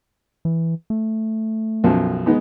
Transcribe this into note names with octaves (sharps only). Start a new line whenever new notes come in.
E3
A3
B1 F#2 F3
G#3 B3 D#4